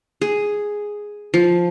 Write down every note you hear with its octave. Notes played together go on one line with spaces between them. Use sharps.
G#4
F3